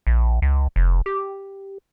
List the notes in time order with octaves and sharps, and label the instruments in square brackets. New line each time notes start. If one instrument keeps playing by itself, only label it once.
[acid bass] A#1
C#2
F1
G4